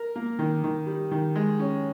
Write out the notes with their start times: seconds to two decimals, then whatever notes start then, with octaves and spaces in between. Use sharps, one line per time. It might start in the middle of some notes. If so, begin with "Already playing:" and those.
Already playing: A#4
0.15 A#3
0.39 D#3
0.64 D#3
0.86 G3
1.11 D#3
1.35 G#3
1.59 C#4